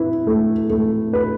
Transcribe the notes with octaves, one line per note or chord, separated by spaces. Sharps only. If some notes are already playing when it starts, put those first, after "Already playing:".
Already playing: E4 B4
A3
A3
B4